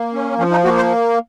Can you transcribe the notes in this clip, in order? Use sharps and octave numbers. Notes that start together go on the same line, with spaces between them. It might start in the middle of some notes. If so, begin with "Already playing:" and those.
Already playing: A#3
C#4
F3 C#4
D#4
A#3 F#4
C5